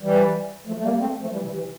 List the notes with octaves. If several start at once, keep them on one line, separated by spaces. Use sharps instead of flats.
E3 G3
F3 A3
A3
G3 A#3
A3 C4
F3 A3
E3 G3
C3 E3
C3 E3